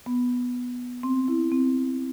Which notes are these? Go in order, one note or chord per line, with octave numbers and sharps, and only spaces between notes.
B3
C4
E4
C4